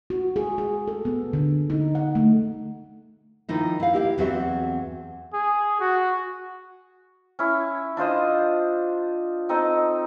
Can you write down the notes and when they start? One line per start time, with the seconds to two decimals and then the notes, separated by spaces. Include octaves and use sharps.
0.10 F#4
0.36 G#4
0.58 G#4
0.88 A4
1.05 B3
1.33 D3
1.70 D#4
1.95 F#5
2.15 A3
3.49 D#3 F3 D#4 E4
3.80 E4 F5
3.93 E4 G4 E5 F5
4.18 E2 F#3 C4 F#4 E5
5.34 G#4
5.80 F#4
7.39 C#4 E4
7.97 D4 F4 C5 D#5
9.49 C4 D#4 A4 D#5